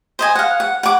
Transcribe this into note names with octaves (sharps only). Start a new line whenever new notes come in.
C5 D#5 G#5
F5 F#5
F#5
F#5 D6